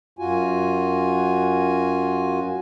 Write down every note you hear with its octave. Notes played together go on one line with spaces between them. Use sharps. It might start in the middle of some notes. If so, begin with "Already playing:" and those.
F#2 F4 F#4 G#5